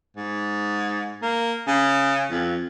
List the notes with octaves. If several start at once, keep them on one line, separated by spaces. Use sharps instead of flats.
G#2
A#3
C#3
F2